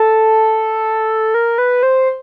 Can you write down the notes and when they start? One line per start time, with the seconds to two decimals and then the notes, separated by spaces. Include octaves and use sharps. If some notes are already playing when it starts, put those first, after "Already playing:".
Already playing: A4
1.34 A#4
1.58 B4
1.83 C5